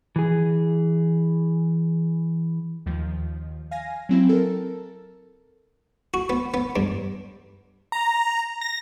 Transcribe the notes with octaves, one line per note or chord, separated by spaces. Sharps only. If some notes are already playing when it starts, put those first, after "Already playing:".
E3 G#4
D#2 D#3 F3
F5 G#5 A#6
F#3 C4 E4
A4 A#4
F#4
B3
B3
G2
A#5
A#6